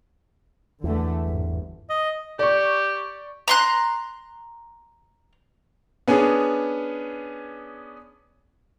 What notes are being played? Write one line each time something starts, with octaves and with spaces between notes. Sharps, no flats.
E2 D3 E3 A3
G1 G#2
D#5
G4 D5 C#6
A#5 C6 F#6
B3 C#4 D4 G#4